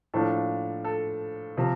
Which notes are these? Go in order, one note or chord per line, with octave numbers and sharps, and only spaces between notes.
A2 F3 A#3 D4 A4
A4
C3 F3